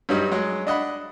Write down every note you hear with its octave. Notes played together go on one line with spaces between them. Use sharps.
G2 F#3 G3 D#4
F#3 G#3
D4 D#5 F#5 B5